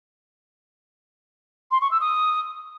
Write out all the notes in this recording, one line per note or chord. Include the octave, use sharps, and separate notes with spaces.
C6
C#6
E6
D#6